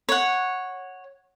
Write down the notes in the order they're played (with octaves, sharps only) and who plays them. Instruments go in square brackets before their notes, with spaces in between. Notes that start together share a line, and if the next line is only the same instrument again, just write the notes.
[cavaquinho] C#5 F#5